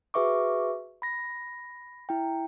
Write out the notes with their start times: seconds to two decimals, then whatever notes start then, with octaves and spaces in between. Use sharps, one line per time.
0.14 F#4 G#4 B4 E5 C#6 D6
1.02 B5 A#6
2.09 E4 G5